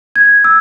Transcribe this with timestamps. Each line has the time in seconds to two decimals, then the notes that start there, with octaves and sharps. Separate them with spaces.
0.16 G#6
0.44 E6